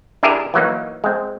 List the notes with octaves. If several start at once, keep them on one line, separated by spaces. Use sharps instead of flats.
D4 E4 G4 G#4 A#4 E5
E3 F#3 A#3 D#4
G#3 C4